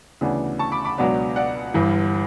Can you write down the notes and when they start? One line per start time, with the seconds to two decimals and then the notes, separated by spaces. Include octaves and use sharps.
0.21 D2 C#3 E3 B3 D4
0.59 A5 C#6
0.72 B5 D6
0.85 B5 D6
0.98 C#2 B2 F#3 B3 D4
1.36 D5 F#5
1.74 G1 G2 E3